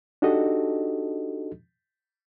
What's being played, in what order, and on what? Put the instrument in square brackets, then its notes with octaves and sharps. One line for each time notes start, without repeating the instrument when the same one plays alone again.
[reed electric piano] D4 D#4 F#4 G4 A4 D#5